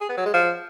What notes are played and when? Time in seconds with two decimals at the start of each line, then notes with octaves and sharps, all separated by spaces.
0.01 G#4
0.09 B3
0.17 F#3
0.25 G#3
0.34 F3